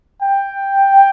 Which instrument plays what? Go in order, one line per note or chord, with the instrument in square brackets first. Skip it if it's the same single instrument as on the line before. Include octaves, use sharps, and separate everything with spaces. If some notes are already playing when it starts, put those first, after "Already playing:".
[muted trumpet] G5